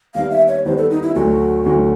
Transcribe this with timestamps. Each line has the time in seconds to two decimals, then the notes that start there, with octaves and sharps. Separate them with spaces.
0.15 D#2 D#3 G3 B3 D4 F5
0.31 E5
0.48 C#5
0.65 D#2 D#3 G3 B3 D4 C5
0.77 A4
0.90 D#4
1.03 E4
1.15 D2 D3 F#3 A3 F#4
1.66 D2 D3 F#3 A3